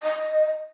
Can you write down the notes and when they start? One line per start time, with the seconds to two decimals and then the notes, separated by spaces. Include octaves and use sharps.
0.03 D#5